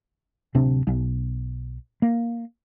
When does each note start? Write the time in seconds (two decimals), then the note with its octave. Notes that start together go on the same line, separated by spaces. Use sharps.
0.55 D1 C3 C4 D4
0.87 B1
2.02 A#3